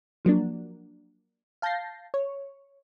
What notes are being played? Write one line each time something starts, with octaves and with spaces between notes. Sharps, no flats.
F3 F#3 A#3 D4
F5 A5 G6 A6 A#6 C7
C#5